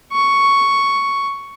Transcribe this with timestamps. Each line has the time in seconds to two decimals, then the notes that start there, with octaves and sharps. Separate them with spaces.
0.13 C#6